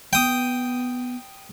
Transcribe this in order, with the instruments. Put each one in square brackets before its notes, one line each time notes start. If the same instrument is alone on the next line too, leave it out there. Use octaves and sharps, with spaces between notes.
[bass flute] B3 [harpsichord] G5 D#6